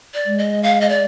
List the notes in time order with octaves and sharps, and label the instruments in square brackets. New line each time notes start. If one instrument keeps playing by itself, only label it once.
[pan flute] D5
[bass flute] G#3
[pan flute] D#5
F5
D#5
D5